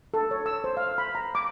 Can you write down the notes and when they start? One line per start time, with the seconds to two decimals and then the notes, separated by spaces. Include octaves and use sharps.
0.14 A4
0.31 C#5
0.46 E6
0.64 C5
0.77 F5
0.98 B5
1.15 A#5
1.35 D6